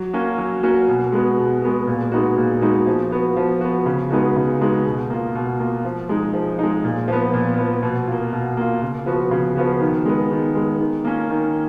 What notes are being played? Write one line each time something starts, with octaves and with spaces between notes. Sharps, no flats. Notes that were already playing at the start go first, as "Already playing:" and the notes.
Already playing: F#3
A#3 C#4 F#4
F#3
A#3 C#4 F#4
B2
G#3 B3 F#4
B2
G#3 B3 F#4
A#2
G#3 B3 D#4 F#4
A#2
G#3 B3 D#4 F#4
F3
B3 F#4
F3
B3 F#4
C#3
G#3 B3 D#4 F#4
C#3
G#3 B3 D#4 F#4
B2
A#3 F4
B2
A#3 F4
F3
G#3 D#4
F3
G#3 D#4
A#2
F3 B3
A#2
F3 B3
B2
A#3 F4
B2
A#3 F4
C#3
F3 B3 F#4
C#3
F3 B3 F#4
D#3
G#3 B3
D#3
G#3 B3
D#3
A#3 C#4 F4
D#3